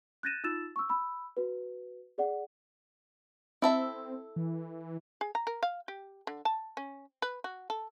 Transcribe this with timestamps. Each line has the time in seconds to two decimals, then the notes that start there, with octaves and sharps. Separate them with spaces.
0.23 F#6 G6 A6 A#6 D#7 E7
0.44 D#4 F4 E6 A6 E7
0.76 C#6 E6
0.89 B5 E6
1.37 F#4 B4
2.18 G#4 D5 F#5
3.62 C4 E4 A4 E5
4.36 E3
5.21 G#4
5.35 A#5
5.47 A#4
5.63 F5
5.88 G4
6.27 D3
6.45 A5
6.77 C#4
7.22 B4
7.44 F#4
7.70 A4